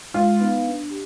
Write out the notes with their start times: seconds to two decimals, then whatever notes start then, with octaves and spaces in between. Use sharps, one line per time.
0.14 G#3 F4
0.39 B3 D#4 B4 F5
0.66 D4
0.90 G4